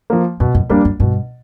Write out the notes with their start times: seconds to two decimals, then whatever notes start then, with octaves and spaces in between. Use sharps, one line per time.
0.10 F3 A#3
0.40 F#2 B2
0.55 F#2
0.69 F2 G3 A#3 D4
0.85 F#2
1.00 G2 B2